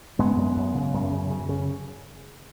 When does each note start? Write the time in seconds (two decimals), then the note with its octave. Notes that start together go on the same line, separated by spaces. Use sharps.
0.19 F#2 G#3 B3
0.37 F#2
0.56 F#2
0.74 C#3
0.94 F#2
1.12 C#3
1.30 C#3
1.49 C#3